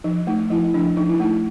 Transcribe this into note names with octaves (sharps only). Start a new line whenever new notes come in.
F3 D#4
A3 D#4
F3 E4
F3 D4
F3 D#4
E4
A3 D#4